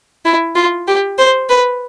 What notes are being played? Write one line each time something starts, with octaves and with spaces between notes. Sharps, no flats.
E4
F4
G4
C5
B4